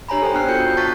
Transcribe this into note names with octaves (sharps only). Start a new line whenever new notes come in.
D4 G4 C#5 G#5 A#5 B5
A4 C5 G5
B3 D4 G5 F6 F#6 C7
B3 F4 F#4 A4 G6 C#7
G6
A5 C#6 A6 B6